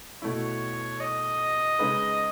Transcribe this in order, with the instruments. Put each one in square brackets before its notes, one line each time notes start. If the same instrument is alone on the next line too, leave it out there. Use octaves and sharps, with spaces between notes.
[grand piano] B2 A3 E4 [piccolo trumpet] C#5
[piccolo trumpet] D#5
[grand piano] C#3 G#3 D#4 G#4 B4